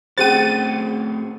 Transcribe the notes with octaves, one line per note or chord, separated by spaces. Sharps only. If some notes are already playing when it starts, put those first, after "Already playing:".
A3 C4 C#4 F#4 G#4 C5 A6 D#7